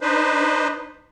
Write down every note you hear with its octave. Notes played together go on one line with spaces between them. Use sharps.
D4 D#4 B4 C5